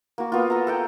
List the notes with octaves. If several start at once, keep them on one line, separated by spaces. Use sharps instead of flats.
A#3 F#4
B3 F4
A4 A#5
A4 F#5 G5